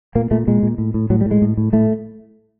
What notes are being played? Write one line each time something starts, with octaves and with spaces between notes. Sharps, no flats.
A#2 A#3
A#2 A3
A#2 G#3
A#2
A2
A2
A2 F#3
G3
A2
G#3
A2
A2
A2 A3